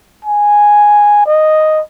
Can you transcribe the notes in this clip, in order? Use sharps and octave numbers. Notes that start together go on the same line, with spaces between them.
G#5
D#5